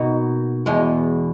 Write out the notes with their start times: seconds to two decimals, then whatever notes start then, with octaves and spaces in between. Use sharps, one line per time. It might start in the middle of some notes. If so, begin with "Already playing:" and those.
Already playing: B2 A#3 D#4 F#4
0.66 E2 B2 G#3